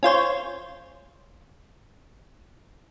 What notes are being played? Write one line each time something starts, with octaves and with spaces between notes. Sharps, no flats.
C#4 F4 C5 C#5